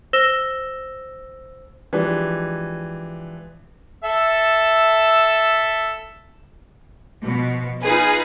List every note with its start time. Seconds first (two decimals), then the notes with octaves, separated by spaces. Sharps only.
0.13 C5 E6 A#6 E7 G7
1.93 E3 F3 G#3 D4 G4
4.04 A4 E5
7.22 B2 F3
7.81 D#4 F4 G#4 B4